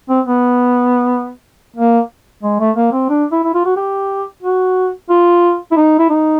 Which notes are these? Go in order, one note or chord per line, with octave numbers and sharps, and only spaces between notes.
C4
B3
A#3
G#3
A3
A#3
C4
D4
E4
E4
F4
F#4
G4
F#4
F4
E4
D#4
E4
D#4